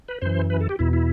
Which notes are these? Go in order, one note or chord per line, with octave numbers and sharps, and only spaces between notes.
B4
F#2 E3 C5
B4
A4
G4
E2 B2 E4
E4